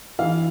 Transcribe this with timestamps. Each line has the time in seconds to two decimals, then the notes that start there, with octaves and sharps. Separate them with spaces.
0.19 E3 F5